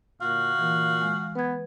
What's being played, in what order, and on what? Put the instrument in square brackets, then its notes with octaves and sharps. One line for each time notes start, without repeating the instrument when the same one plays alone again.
[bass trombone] A#2 [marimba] D3 [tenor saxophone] F#4 [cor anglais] F5
[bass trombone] A#2 [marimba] E3
[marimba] G#3
[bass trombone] B3 [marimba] B4 G#6